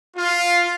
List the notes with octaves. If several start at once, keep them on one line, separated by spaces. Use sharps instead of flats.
F4